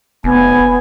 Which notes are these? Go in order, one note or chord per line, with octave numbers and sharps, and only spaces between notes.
F1 B3 G#5